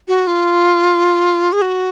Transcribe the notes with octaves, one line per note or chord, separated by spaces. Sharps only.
F#4
F4
G#4
F#4